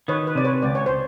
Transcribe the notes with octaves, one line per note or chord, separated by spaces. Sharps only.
D#3 B4 C#5
B4
C3 D5
B4 C#5
C#2 D5
C#5
C5